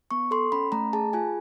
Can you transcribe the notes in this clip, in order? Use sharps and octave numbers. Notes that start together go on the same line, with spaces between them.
B3 C#6
A4 C6
C#4 B5
A3 A#5
G#4 A5
F4 G#5